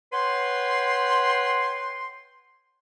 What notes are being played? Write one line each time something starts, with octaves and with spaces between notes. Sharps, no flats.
B4 C#5 F#5 G5 C6